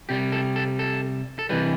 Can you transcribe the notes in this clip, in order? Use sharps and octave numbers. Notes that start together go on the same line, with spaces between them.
C3 G3 G4
A4
A4
A4
A4
C3 E3 G3 B4